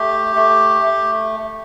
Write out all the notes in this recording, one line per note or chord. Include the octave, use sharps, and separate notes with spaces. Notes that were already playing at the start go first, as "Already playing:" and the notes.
Already playing: A3 G4
A3
A3